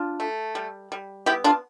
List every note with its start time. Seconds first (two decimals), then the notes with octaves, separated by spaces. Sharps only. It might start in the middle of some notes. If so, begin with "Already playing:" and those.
Already playing: D4 F4
0.20 A3
0.55 G3
0.92 G3
1.26 B3 E4 G4
1.44 D4 F4